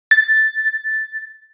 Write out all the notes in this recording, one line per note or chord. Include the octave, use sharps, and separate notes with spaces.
A6